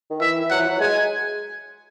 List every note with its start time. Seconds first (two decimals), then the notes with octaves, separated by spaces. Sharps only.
0.10 D#3
0.21 E3 E5
0.50 F#3 F#5
0.59 E3
0.68 F#3
0.80 G#3 G#5